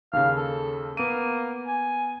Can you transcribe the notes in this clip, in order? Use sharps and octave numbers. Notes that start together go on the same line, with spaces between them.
D#2 C#3 F5
A4
A#3 B3 D7 D#7
G#5